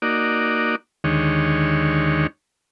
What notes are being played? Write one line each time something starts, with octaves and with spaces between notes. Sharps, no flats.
A#3 D#4 F#4 D5
D#2 D3 D#3 G#3 C#5